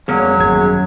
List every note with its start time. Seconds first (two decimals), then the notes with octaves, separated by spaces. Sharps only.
0.08 F2 F#3 G3 A#3 B3 C#4 G#4 C#5
0.40 G#1 F#2 G#4 G#6